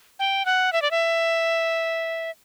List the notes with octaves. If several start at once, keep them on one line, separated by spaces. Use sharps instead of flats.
G5
F#5
E5
D5
E5